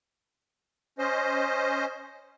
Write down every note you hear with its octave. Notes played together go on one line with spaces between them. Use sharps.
C#4 C5 D#5